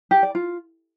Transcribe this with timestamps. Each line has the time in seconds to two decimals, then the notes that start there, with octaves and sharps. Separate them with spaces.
0.11 G4
0.23 D5
0.35 F4